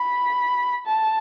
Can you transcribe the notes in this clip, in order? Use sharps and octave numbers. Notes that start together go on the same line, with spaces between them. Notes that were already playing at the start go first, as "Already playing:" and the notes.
Already playing: B5
A5